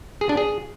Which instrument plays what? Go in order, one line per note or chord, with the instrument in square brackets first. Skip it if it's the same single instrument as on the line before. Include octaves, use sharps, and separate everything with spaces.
[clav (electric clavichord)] G#4
D4
G#4